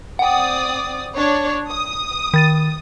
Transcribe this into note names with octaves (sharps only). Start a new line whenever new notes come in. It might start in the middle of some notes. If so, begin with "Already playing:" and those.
C4 D5 F#5 G5 D#6
D4 C#5
D#6
D#3 A6 D#7